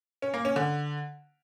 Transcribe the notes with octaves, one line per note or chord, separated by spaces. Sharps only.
C#4
A#3
C#4
D3